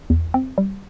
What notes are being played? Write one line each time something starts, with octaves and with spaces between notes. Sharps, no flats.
E2
C4
G3